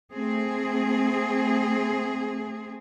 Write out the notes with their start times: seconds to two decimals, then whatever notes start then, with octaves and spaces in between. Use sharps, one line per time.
0.14 A3 C4 G#4